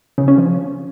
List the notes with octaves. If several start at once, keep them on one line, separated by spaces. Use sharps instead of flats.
C#3
C#4
F3